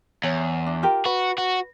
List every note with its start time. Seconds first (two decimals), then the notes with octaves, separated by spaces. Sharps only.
0.24 E2 C#5
0.66 D4
0.83 F4 G4 A#4
1.05 F#4 B4
1.38 F#4